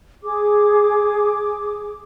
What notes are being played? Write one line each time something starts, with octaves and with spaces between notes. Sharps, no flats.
G#4 D6